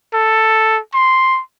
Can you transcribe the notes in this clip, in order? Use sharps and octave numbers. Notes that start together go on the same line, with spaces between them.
A4
C6